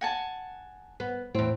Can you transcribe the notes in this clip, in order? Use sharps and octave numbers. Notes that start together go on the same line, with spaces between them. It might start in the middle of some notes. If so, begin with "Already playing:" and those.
F#5 G#5 A5
B3
E2 A2 C4